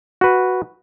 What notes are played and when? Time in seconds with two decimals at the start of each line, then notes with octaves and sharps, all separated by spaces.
0.21 F#4 B4